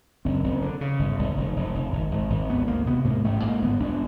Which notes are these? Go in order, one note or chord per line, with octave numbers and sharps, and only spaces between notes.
F#1 C4
F#1
D3
C#3
G1
G1
F1
F1
F1
G#1
G#1
G#1
D2 B3
D2 A#3
C3 B3
G#2 A#3
A1 A3
G#2 A#3
G1 B3
G1 D4